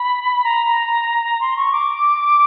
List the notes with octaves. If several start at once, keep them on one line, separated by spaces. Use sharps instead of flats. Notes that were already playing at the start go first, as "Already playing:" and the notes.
Already playing: B5
A#5
C6
C#6
D6